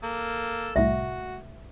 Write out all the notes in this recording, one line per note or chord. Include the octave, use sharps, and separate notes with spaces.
A#3 A4
C2 A2 F#4 E5